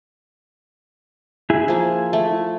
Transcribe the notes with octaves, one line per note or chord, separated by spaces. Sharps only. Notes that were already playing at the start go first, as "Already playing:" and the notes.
E4 G#4
F3 A#3
A3